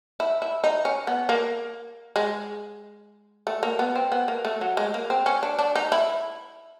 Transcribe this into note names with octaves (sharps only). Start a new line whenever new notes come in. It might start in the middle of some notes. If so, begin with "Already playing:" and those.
E4
E4
D#4
C#4
B3
A#3
G#3
A3
A#3
B3
C4
B3
A#3
A3
F#3
G#3
A#3
C4
C#4
D4
D4
D#4
E4